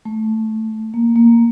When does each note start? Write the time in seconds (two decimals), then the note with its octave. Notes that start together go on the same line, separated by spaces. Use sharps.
0.05 A3
0.94 A#3
1.16 A#3